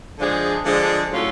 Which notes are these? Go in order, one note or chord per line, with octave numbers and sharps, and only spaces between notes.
D3 F3 G#3 D4 G#4
D3 F3 G#3 D4 G#4
A2 F#3 C#4 F4 A4